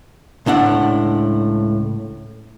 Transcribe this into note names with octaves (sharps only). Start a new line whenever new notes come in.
C#2 A2 D4 F#5